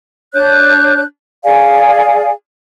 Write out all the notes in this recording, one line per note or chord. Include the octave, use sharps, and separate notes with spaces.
D4 C#5 F#6 G6
G#4 D5 F5 G#5